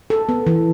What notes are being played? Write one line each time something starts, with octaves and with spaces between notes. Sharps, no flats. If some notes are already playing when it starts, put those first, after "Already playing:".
A4
B3
E3